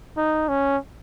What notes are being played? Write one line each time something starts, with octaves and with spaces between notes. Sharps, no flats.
D#4
C#4